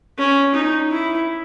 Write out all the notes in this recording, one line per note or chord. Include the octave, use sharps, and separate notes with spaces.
C#4
D#4
E4